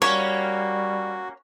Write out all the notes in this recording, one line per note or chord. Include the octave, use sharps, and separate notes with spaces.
G3 A#3 C#4 F#4 C#5